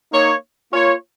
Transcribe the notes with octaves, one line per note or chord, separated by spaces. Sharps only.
A#3 D#4 C#5
A#3 F4 C#5